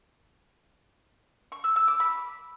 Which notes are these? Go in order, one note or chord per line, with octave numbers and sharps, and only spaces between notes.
C#6
E6
E6
D6
B5